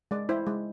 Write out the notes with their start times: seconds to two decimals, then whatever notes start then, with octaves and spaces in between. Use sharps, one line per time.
0.11 G#3 D5
0.29 E4 C5
0.47 G#3